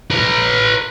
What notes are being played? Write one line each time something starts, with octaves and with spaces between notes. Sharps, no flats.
B4 A#5